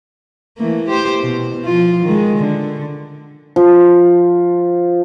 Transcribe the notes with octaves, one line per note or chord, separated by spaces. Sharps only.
E3 A3 A#3
G4 C5
B2
F3 F4
D#3 G#3
D3
F3